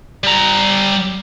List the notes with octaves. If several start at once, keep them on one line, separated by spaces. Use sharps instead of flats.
G3 A#5